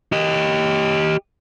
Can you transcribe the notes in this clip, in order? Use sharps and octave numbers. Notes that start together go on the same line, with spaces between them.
G4 D#5